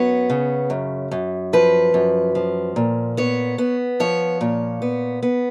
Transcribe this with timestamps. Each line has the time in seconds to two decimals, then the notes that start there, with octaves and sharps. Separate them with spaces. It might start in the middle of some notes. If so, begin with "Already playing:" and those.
Already playing: F#2 B3 C#5
0.30 C#3
0.70 F#2
1.11 F#2
1.53 F3 B4
1.94 F#2
2.35 F3
2.76 A#2
3.17 B3 C#5
3.58 B3
4.00 F3 C#5
4.41 A#2
4.82 B3
5.22 B3